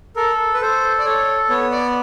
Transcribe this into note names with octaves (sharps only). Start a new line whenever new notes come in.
A4 A#4
B4
A4 C5
D5
A4 C#5
B3 C#5
D5